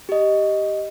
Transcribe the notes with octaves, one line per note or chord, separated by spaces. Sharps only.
G4 D#5